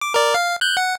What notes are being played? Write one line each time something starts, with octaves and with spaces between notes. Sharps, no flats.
D6
A#4 D5
F5
F#6 G6
F#5